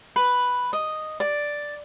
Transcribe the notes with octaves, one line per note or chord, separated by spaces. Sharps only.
B4
D#5
D5